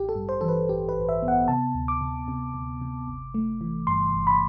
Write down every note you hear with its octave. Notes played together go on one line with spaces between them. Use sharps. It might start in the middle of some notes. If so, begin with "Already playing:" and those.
Already playing: A1 G4
A4
G2
C5
E3 A4
B4
A1 G4
B4
A1
E5
B3
F#5
C3 A5
D2
D6
C3
C3
D2
C3
G1
A3
E3
G2 C6
G1
B5